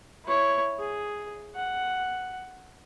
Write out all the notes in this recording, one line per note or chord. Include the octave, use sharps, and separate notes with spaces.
E4 C#5
G#4
F#5